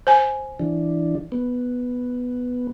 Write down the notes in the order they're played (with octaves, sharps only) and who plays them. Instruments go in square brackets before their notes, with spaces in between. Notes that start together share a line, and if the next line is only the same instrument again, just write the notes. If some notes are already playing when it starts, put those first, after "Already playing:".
[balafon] C5 G#5
[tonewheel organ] E3 D4
B3